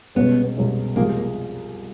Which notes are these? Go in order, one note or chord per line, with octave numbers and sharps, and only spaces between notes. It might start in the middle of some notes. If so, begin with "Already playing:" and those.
C2 B2 G#3 B3 C#4
C2 B2 G#3 C#4
C2 C3 F3 G#3 A#3
A#3